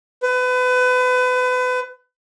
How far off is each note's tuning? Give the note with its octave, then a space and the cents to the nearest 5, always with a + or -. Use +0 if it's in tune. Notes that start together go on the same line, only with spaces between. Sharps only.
B4 +30